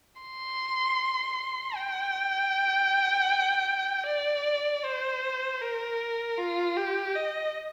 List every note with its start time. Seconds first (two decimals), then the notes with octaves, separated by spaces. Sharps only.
0.21 C6
1.75 G5
4.07 D5
4.84 C5
5.61 A#4
6.38 F4
6.77 G4
7.15 D#5